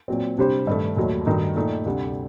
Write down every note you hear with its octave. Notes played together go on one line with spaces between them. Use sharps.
A#2 F#3 C4
C3 G3 D4 G4 C5
G2 D#3 A3
D#2 D#3 F#3 A3
G2 D#3 A3 D#4 F#4
A#2 A3 D#4
D2 C3 G3 D4